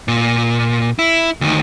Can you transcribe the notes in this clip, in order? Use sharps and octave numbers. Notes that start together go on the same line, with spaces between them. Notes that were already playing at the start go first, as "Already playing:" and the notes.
A#2
E4
D2 D#3